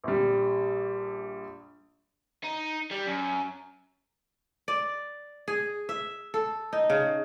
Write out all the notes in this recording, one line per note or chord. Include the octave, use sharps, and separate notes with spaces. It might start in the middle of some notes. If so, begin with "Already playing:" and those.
A#1 G3
D#4
G3
F#2
D5
G#4
E5
A4
D#4
C#3